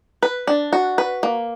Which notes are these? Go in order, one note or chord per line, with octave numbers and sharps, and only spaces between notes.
B4
D4
F#4
B4
A#3